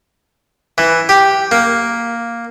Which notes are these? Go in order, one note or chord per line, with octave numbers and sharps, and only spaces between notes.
E3
G4
A#3